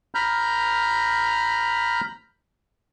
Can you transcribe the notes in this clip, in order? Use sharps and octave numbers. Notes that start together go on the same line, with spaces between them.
A#5 B5 F6 G6